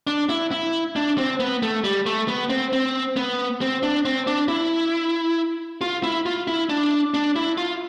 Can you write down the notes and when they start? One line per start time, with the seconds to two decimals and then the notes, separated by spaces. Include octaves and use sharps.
0.07 D4
0.29 E4
0.52 E4
0.96 D4
1.18 C4
1.40 B3
1.63 A3
1.84 G3
2.06 A3
2.28 B3
2.50 C4
2.73 C4
3.16 B3
3.61 C4
3.83 D4
4.05 C4
4.27 D4
4.48 E4
5.81 F4
6.03 E4
6.26 F4
6.48 E4
6.69 D4
7.14 D4
7.36 E4
7.58 F4